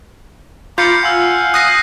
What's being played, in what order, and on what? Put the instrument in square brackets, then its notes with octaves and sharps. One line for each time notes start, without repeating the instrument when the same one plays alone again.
[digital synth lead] F4 [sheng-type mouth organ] A#5 B5 D6 [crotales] G6 C7 C#7
[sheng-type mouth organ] F5 F#5 G#5 [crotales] E6 G6
[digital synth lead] D#6 [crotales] F#6 A#6 C7